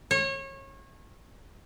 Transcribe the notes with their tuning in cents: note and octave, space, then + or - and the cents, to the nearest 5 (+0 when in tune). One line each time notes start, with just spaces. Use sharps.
C#5 -30